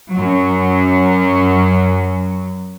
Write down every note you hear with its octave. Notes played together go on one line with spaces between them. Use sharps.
F#2 F#3